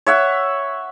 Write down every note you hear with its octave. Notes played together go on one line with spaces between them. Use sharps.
C#5 E5 F#5